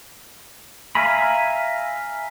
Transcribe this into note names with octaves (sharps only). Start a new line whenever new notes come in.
E5 F5 G#5 A#5 B5